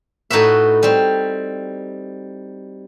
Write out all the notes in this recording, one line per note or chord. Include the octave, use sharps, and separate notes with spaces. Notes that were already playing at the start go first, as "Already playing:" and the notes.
A2 D#4 F#4 B4 E5
G3 C4